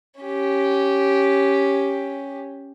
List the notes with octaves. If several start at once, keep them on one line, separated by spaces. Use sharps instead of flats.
C#4 G4